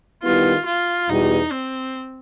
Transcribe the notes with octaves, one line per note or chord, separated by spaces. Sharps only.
D#3 G3 B3 E4 F4
F4
E2 B2 G3 D#4
C4